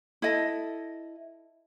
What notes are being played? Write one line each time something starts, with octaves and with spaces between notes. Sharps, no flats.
E4 A4 D#5